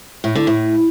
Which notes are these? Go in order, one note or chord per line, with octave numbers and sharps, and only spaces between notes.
A2
D3
A2